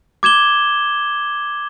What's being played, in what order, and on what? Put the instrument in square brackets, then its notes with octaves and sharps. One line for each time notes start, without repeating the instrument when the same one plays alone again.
[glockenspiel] D6 G#6 E7 G7